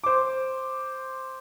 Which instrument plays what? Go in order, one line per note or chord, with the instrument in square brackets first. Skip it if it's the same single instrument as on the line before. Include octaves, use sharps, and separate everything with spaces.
[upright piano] C5 D6